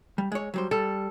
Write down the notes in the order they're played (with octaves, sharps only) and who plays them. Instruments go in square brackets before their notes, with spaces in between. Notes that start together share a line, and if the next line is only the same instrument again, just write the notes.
[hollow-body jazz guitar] G3
G#3 C#5
F#3 G3 C5
[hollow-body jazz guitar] G3 [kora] A4